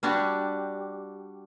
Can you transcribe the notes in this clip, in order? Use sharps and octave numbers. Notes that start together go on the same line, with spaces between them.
G3 D4 F#4 G4